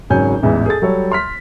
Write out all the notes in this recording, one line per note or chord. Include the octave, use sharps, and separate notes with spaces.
G#1 C#3 F#3 C#5 G#5 G6
A1 E2 G#2 E3
G#4 A4 A6
F#3 G3 A4 C#5
C6 F6 B6